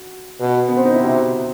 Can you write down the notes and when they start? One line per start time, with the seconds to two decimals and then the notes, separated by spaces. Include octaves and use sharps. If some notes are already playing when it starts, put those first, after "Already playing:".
Already playing: F#4
0.40 B2 F#4
0.69 B3
0.77 C4
0.85 D#4
0.94 E4
1.01 C3 F#4